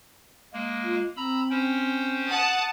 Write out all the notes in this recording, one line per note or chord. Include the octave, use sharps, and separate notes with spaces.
G#3 A#3
F4
C4 A#5 B5 E6
C#4 C5 G5
F#5 A5 D#6